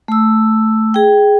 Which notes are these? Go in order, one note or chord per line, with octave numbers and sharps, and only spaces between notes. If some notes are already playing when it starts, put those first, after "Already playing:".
A3 E6
G#4 G5